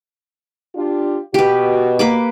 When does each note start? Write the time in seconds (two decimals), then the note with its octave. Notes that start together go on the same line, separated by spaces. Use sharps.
0.75 D4 F4 G4
1.34 B2 F#4 G4 B4
1.99 A#3 B4 D6